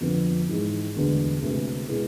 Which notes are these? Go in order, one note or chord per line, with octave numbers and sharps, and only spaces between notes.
F2 D3 F3 B3
G#2 E3 G#3
E1 D2 D3 G#3 B3
D2 C3 G#3 B3
B2 G#3 B3 E4 G#4